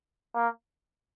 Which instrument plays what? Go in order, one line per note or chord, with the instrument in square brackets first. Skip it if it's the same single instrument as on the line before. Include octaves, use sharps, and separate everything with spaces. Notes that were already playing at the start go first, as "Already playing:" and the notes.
[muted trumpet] A#3